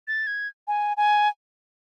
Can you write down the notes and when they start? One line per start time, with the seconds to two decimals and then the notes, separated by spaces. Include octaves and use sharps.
0.08 A6
0.27 G#6
0.68 G#5
0.97 G#5